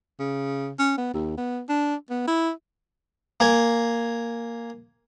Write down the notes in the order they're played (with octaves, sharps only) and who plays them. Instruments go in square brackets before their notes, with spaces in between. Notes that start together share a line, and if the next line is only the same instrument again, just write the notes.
[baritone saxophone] C#3
C#4
B3
D#2
B3
D4
B3
E4
[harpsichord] A#3 G#5